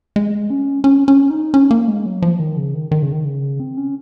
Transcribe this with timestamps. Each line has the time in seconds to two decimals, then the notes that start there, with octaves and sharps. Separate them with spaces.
0.16 G#3
0.50 C#4
0.84 C#4
1.08 C#4
1.30 D#4
1.54 C#4
1.71 A#3
1.88 G#3
2.06 F#3
2.22 F3
2.39 D#3
2.57 C#3
2.74 D#3
2.91 D#3
3.02 C#3
3.12 D#3
3.25 C#3
3.60 C4
3.77 C#4